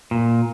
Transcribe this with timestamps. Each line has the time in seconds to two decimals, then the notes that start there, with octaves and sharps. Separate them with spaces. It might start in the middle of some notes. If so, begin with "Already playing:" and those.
0.11 A#2